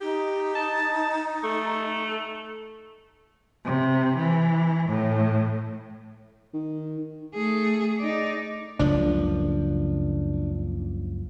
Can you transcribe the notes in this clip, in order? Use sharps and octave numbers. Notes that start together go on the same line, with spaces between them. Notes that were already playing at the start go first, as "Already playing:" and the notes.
D#4 G4
A5
A3
C3
E3
A2
D#3
A3 G#4
D#4 D5
F#1 C#2 F3 D4